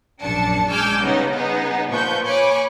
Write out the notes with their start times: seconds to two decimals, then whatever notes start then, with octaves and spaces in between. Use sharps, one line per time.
0.22 A#1 F#2 D4 A5 C#7
0.71 G#3 G#5 D6 E6 F6 G6
1.02 C#3 G3 B3 C#4 D#4
1.34 B3 D#4 G#4
1.89 A#2 F3 B4 C#6 G6
2.25 C#5 G#5 B5 C#6 D6